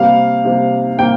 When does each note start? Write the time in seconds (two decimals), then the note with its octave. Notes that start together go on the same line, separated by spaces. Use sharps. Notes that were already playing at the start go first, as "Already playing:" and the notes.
Already playing: C3 G3 A#3 F5
0.45 C3 G3 A#3
0.98 C3 G3 A#3 G5